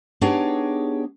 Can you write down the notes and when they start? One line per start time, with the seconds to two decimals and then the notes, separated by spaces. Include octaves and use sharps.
0.21 B3 D4 D#4 G4 G#4 C#5